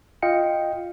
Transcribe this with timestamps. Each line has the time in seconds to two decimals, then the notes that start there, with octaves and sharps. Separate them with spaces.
0.22 F4 D#5 F5 G5 C#7